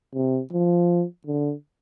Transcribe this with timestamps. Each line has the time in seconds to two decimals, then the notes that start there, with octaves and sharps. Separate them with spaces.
0.15 C3
0.53 F3
1.27 D3